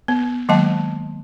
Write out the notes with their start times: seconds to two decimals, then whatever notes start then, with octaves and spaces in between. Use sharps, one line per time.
0.08 B3
0.49 D#3 F#3 G#3 A#3 D#5 A5